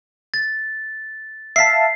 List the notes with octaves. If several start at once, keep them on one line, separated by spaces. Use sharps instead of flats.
A6
E5 F5 A5 B6 C7